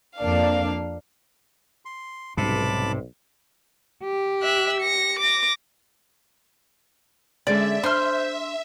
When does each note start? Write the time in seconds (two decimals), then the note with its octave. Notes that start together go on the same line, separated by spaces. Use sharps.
0.17 F2 A#3 D4 F5
1.85 C6
2.37 B1 G#2 C3 G3 C#4 A5 B5 D6
4.03 G4
4.43 E5 F#6
4.80 A#6 C#7
5.19 D6 A#6
7.47 D3 G#3 C#4 D5 E5
7.84 D4 C5 C6 F6